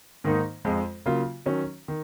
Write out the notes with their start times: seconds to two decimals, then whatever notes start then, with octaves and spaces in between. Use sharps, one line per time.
0.24 G#2 D#3 A#3 D#4
0.65 F2 F3 G#3
1.06 C#3 F#3 A#3 F4
1.46 D#3 F#3 C#4
1.88 D#3